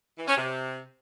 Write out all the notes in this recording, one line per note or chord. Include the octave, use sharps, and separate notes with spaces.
E3
C#4
C3